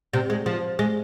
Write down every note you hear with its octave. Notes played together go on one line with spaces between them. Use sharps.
C3
G#3
F3
G#3